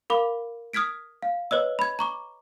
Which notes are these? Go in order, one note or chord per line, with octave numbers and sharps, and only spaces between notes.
A#4 F5 B5 D6
D#6 F6 G#6 B6 D7
F5
B4 C#5 D#5 E6
B5 G#6
A#5 C#6 D6